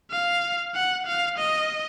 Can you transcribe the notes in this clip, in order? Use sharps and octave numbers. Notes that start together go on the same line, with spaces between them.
F5
F#5
F5
D#5